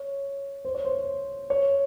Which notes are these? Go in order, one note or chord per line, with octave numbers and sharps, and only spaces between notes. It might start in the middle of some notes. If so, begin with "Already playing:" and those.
Already playing: C#5
C5
C#5
C5
C#5